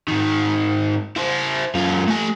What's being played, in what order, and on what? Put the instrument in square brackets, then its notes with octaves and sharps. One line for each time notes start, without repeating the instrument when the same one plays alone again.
[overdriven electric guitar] G#2 D#3
E4 C5
F#2 F4
A3 G#5